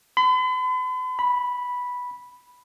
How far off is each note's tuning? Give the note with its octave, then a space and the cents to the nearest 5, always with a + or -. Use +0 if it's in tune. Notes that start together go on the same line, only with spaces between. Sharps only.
B5 +45
B5 -5